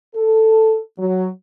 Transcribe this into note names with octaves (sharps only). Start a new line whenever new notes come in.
A4
F#3